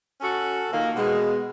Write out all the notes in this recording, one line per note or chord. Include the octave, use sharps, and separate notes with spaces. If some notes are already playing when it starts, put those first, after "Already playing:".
C#4 F#4 A4
A#2 D#3 A#3
B2 G#3